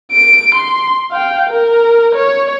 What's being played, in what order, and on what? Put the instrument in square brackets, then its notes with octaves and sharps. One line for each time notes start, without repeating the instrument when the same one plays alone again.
[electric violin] D7
C6
F5 G5
A#4
C#5